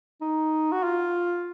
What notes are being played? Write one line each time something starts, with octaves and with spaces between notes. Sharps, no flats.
D#4
F#4
F4